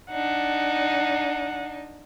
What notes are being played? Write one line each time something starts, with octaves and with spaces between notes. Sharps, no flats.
D4 D#4 F#5